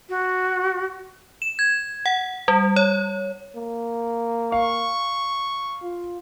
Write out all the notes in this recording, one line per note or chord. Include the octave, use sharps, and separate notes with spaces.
F#4
E7
G#6
F#5
G3
C#5
A#3
F5 C#6
F4